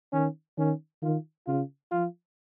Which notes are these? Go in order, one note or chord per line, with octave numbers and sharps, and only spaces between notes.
D#3 C#4
D#3 C#4
D#3 F4
C#3 F4
F3 F4